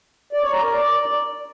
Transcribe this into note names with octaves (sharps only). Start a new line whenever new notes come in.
D5
C#5
A#5
A#4
D5